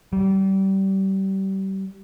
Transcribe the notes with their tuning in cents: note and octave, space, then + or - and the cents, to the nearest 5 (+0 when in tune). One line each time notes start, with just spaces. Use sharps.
G3 -25